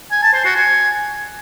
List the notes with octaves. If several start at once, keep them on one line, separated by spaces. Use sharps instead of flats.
G#5
A5
C5
F#4
G#5